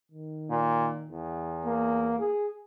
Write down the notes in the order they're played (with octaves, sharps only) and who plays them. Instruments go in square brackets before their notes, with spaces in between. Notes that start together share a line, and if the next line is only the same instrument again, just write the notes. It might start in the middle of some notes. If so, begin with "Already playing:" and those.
[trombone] D#3
[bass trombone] A#2
E2
[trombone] A#3
G#4